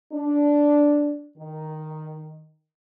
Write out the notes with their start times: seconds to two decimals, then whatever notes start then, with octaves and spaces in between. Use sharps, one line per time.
0.13 D4
1.38 D#3